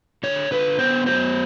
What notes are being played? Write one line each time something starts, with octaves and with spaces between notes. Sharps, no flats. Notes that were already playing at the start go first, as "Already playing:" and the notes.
D3 C#5
D3 B4
B3 C5
F#3 C5